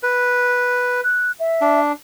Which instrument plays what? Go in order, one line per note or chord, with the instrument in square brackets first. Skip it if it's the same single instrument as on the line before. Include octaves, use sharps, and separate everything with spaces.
[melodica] B4
[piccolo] F#6
E5
[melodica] D4